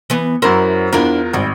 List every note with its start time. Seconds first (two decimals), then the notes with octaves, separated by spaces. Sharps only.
0.10 E3 B3
0.42 F#2 F#3 E4 A#4 C5
0.93 E2 D4 E4 F4 A#4
1.33 G#1 G#2 G3